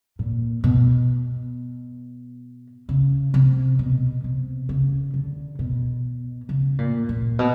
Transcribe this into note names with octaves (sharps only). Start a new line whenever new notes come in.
A#2
B2
C#3
C3
B2
C3
C#3
D3
B2
C#3
A#2
A#2
B2